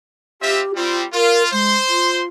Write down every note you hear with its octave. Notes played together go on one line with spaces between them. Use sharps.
C4 F4 G4 E5
G3 C4 F4
F4 A#4
G#3 C5 C6
F4